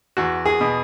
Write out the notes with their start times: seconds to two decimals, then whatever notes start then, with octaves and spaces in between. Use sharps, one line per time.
0.17 E2 F#4
0.46 G#4
0.61 B2